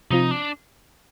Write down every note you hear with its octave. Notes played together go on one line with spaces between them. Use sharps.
C3 F3 C4 D#4 F4
D4